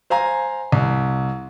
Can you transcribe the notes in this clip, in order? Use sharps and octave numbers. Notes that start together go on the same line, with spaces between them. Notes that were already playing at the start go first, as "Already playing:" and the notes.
C5 F5 G#5 A#5
C2